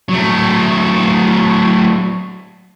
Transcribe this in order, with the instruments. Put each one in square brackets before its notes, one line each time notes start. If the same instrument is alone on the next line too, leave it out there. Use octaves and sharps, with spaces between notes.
[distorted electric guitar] F#3 A3